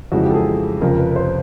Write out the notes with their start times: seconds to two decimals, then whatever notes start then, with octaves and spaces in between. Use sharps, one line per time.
0.12 F2 C#3 E3 G#3 F#4
0.23 G4
0.31 A4
0.34 G#4
0.81 F1 F2 C#3 F3 A#4
0.99 B4
1.12 B4
1.16 C5